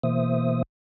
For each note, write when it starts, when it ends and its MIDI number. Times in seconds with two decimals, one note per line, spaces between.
0.03 0.63 47
0.03 0.63 52
0.03 0.63 58
0.03 0.63 72
0.03 0.63 76
0.03 0.63 87